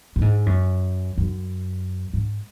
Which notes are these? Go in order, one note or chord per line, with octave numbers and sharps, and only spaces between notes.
A2
G#2
F#2
F#2
G#2